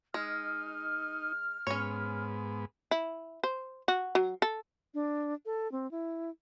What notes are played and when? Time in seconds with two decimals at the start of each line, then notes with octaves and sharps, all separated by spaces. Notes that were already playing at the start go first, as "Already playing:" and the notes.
0.14 G#3 D#4 F6
1.67 G#2 B3 C#4 C#5
2.91 E4
3.44 C5
3.88 F#4
4.15 F#3
4.42 A4
4.94 D4
5.46 A4
5.72 C4
5.91 E4